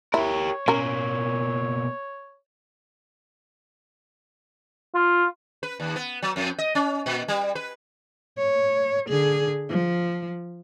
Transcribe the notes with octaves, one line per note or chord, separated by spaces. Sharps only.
E4 G4 A#4 C#5
B2 A#3 C#4 A#4
F4
B4
D#2
B3
F#3
F2
D#5
C#4
A#2
G3
B4
C#5
D3 G#4
F3